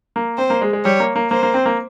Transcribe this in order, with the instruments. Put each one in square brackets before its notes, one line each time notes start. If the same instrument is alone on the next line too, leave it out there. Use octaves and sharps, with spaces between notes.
[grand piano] A#3
[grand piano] C4 [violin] C5
[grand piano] A#3
G#3
G#3
[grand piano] G3 [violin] C#5
[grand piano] A#3
A#3
[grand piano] A#3 [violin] C5
[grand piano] A#3
C4
A#3